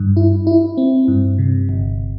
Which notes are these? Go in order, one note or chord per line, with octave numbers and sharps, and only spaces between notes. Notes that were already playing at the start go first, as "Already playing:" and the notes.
Already playing: G2
E4
E4
C4
G2
C3
G1